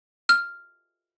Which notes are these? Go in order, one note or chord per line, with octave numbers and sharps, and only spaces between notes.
F6